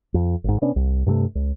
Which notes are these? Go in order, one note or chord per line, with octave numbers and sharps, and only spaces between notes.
F2
G#1 G#2
C3 B3 C#4 D4
C2
G2 C3 E3 A3
C#2